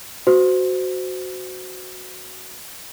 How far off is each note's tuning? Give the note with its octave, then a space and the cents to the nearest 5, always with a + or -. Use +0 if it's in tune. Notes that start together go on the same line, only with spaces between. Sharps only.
F#4 +0 C5 -25